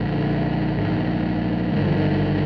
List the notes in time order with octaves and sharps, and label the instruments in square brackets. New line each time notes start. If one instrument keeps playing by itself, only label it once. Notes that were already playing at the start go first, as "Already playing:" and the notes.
Already playing: [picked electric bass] A#1 G#2 D3
A#1 G#2
G#1 G2 D3 D#3
F3
D#3